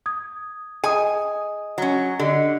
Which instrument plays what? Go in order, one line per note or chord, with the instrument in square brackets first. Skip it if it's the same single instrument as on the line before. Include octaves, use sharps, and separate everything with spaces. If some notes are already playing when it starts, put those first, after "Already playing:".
[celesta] D#6 G#6
[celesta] G#4 D#5 D#6 [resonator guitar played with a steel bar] G#5
[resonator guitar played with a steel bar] F#3 C#4
[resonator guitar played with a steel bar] D3 [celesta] G4 D#5